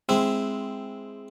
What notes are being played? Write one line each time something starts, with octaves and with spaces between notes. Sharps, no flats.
G#3 C4 E4